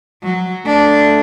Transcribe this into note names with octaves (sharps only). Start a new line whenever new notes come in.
F#3
A3 D4